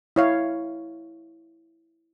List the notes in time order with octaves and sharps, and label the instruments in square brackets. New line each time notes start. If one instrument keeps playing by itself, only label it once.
[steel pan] E4 C#5 F5